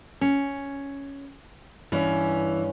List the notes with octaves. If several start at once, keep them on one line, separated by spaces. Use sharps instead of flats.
C#4
G2 E3 C#4